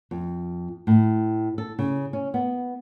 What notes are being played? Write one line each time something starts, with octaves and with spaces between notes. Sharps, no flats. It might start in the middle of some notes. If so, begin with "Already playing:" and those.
F2
A2
A4
C#3
C#4
B3